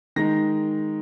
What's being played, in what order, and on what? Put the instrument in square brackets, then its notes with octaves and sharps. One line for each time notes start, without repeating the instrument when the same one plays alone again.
[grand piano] D#3 G#3 D#4 A#6